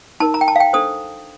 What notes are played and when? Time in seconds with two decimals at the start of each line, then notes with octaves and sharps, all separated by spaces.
0.20 D#4 A#4 A5
0.34 A#5
0.41 G5
0.48 A5
0.56 F5
0.60 G5
0.73 D4 A4 C5 D#6